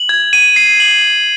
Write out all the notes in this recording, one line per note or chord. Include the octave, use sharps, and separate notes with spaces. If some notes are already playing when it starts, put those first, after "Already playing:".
Already playing: F#7
G#6
D#7
C7
F#7